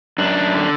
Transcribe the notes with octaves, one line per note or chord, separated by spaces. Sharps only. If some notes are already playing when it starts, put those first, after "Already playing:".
F#2 D4
D3